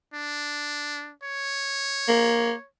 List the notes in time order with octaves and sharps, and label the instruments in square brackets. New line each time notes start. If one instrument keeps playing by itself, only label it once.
[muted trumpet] D4
C#5
[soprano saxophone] A#3